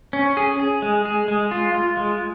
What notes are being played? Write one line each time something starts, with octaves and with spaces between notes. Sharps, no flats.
C#4
G#4
G#4
G#3
G#4
G#3
F4
F4
G#3